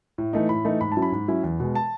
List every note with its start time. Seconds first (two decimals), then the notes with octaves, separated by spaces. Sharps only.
0.18 A2
0.33 E3 A3 D#4
0.49 A2 B5
0.65 E3 A3 D#4
0.81 G#2 B5
0.92 A5
0.97 F#3 C#4 E4
1.02 B5
1.12 G#2
1.28 F#3 C#4 E4
1.44 E2
1.60 B2 G#3
1.75 A5